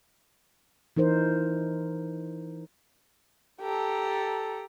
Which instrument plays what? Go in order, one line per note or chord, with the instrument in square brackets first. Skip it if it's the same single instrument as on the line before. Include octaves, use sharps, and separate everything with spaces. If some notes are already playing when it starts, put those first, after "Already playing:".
[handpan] E3 D#4 A#4 C5
[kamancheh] G4 A#5 [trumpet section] A4